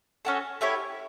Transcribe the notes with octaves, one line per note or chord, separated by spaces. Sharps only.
C#4 F#4 A4
A3 E4 G4 C#5